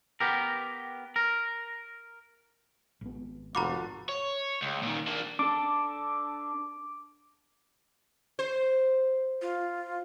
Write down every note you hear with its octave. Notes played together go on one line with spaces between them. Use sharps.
B3 G4 A#4
A#4
G#1 B3
F1 A3 F4 F#4 A#5 B5 D6
C#5
C#2
A#2 D#3
A#3 D4
D4 A4 D6
C5
F4